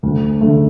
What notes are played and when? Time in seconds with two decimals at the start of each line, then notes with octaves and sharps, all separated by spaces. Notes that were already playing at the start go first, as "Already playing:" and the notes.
0.03 D2
0.41 D3 A3